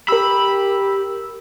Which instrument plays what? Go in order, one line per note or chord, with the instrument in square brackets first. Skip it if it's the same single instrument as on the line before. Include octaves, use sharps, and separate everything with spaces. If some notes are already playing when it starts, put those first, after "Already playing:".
[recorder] G4 [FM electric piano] A#4 E6 [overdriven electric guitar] B5